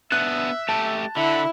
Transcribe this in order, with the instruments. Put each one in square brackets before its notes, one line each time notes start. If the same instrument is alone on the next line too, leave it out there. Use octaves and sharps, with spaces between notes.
[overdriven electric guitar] B3 D4 [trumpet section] E5 [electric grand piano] F#6
[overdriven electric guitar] A3 G4 [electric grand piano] A5
[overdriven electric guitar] D3 [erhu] E4 [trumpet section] F#5 B5